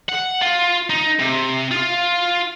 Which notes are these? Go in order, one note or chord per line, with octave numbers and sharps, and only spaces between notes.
F#5
F4
D#4
C3
F4